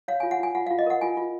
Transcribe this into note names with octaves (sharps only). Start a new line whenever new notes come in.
C#5 F5
F4 G#5
F#5
F4 G#5
F4 F#5
F4 F5
D#5
A#4 F#5
F4 G#5
F4